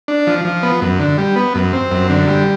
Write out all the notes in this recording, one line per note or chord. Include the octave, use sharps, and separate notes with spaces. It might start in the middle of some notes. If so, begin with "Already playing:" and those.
D4
F3
F3
B3
F#2
D3
G3
B3
F#2
C4
F#2
D3
G3